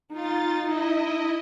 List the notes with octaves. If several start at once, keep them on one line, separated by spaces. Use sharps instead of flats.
D#4 F4 A6
E4 D#5